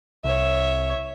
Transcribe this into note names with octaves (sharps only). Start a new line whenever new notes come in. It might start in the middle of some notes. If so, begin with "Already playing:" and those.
C2 C#5 E5